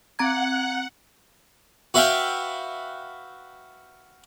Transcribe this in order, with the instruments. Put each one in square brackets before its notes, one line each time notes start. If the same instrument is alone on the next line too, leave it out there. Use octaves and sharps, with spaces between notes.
[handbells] C4 A#5 G#6 [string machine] F#5
[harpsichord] F#4 B4 E5 F5 G5